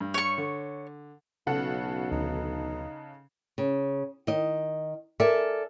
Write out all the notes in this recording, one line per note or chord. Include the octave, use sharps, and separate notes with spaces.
G2
C#5 C#6
D3
B1 C#3 F#4 A4 F#5
D2 D#4
C#3
D#3 D#5
A4 A#4 D5 E5 G#5